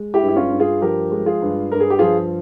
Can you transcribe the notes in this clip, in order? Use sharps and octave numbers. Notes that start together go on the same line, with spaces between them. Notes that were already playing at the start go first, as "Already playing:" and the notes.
Already playing: G#3
E4 G4
G2
E4
C#4 F4
G2
F4 G#4
F3 G4 A#4
G#3
F4 G#4
G2
G2 A#4
G#4
G4
F3 F4 G#4